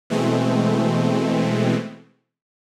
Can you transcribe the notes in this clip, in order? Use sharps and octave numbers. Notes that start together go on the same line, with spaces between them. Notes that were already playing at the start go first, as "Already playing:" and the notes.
B2 E3 G#3 A3 C4